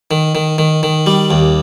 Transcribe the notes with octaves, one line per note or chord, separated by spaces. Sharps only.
D#3
D#3
D#3
D#3
G3
D#2